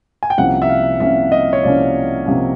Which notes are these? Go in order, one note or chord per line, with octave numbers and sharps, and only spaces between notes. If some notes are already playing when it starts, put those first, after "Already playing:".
G#5
G5
C2 C3 F3 A#3 C#4 F#5
E5
F5
C2 C3 F3 A#3 C#4 E5
D#5
C#5
C2 C3 F3 A#3 C#4 D5
C3 F3 A#3 C#4